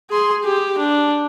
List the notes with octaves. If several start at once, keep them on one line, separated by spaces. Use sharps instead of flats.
G#4 C6
G4
D4